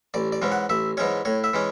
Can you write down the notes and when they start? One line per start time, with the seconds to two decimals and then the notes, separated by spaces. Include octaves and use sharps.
0.14 A1 D5
0.32 D5
0.42 G#2 E3 G#3 C#4
0.52 F#5
0.69 A1 E5
0.97 G#2 E3 G#3 C#4 C#5
1.25 A2 C#5
1.44 E5
1.53 E3 G#3 C#4